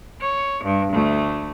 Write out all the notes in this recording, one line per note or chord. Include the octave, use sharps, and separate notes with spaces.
C#5
G2
D2 A3